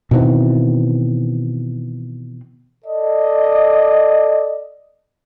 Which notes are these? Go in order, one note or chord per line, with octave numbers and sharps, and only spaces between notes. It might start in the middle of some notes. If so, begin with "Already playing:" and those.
B2 D#3 E3 C4
A4 D5 D#5